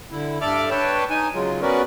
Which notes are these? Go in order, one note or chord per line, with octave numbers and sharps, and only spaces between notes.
D3 E4
G2 A4 D5 E5 D6 F6
D4 B4 C#5 G5 A5
D#4 G#5
C#3 F#3 G#3 F4
B3 C#4 F#4 A#4 B4 D5